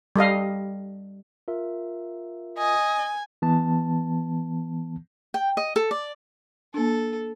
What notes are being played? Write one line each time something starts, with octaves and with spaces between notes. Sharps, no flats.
G3 A4 D#5 F5
F4 A#4 E5
D#5 G#5
E3 B3 A5
G5
D#5
A4
D5
A#3 D4 A4